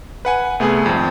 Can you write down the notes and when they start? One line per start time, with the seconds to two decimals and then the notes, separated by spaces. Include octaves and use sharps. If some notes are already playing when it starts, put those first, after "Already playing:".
0.25 B4 F#5 G#5
0.60 C2 A3 B3 G#4
0.86 G#1 F2